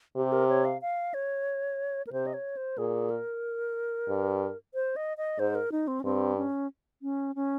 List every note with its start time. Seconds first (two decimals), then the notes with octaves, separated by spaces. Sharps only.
0.16 C3 G4
0.32 A#4
0.49 C#5
0.65 F5
0.82 F5
1.14 C#5
2.07 A#4
2.13 C3 C5
2.27 D#5
2.34 C#5
2.57 C5
2.78 A#2 G#4
3.10 A#4
4.09 G2
4.74 C5
4.96 D#5
5.17 D#5
5.39 G#2 C5
5.55 A#4
5.72 D#4
5.88 C4
6.00 C#4
6.04 G2 C4
6.38 C#4
7.02 C#4
7.36 C#4